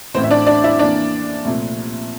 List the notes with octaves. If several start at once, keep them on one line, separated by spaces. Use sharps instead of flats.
A1 A2 E3 C4 C5
E5
D4 D5
D4 D5
E4 E5
F2 E3 A#3 D4 D5
C2 A#2 F3 A3